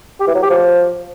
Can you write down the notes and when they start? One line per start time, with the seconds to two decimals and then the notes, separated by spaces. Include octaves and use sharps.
0.20 G4
0.27 E3
0.35 F#3
0.42 G4
0.50 F3